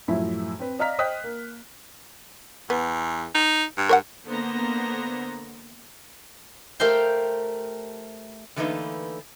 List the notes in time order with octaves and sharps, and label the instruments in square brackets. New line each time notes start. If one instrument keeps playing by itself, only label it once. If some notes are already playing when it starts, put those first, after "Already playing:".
[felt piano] F#2 A2 F3 E4 E5
C4 B4
D5 D#5 F5 A#5 F6 B6
C5 D#5 G5 D#6 F#6 B6
A#3
[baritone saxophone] E2 [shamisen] B3
[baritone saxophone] D#4
G2
[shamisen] A#4 C#5 F#5
[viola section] D3 A#3 B3 C5 A#5
[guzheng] A3 G4 A#4 C5 F5 G5
[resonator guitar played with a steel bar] D3 E3 A3 A#3 D#4 B4